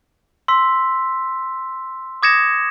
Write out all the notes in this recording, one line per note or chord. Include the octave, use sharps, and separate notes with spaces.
C6 E6 B6
D6 D#6 G#6 A#6 C#7 E7